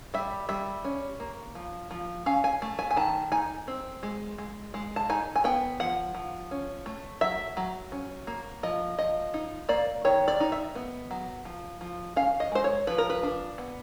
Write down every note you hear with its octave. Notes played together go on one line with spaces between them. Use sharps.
G3 E5
G3 E5
C#4
A#3
F3
F3
C#4 F5
G#5
A3
G#5
G#5
D#3 A5
D#4 G#5
C4
G#3
G#3
G#3
A5
D#4 G#5
G#5
B3 G5
F3 F#5
F3
C#4
A3
F#3 E5
F#3
C#4
A#3
F3 D#5
F3 D#5
D#4
A#3 D5
D#3 C#5
D5
D#4
E5
B3
F#3
F3
F3
C#4 F5
D#5
G#3 C5
C#5
F3 B4
A#4
B4
D4
B3